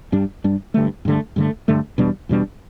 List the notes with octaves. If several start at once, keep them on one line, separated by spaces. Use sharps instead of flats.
G2 G3 D4
G2 G3 D4
G2 D3 A3
G2 D3 A3
G2 D3 A3
G2 D3 A3
E2 B2 G3 D4
E2 B2 G3 D4